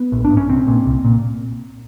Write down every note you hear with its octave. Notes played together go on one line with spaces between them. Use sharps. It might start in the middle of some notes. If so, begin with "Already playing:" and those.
Already playing: B3
A#1
D4
G#2
C#4
C2 C4
A#2
C2
A#2